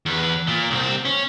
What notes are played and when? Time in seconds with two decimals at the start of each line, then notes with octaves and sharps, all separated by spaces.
0.06 E2 B4
0.47 A#2
0.71 C2 C4
1.05 C#4